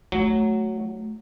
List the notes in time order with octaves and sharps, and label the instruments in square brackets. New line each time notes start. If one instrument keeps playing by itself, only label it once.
[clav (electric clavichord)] F#3 [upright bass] A3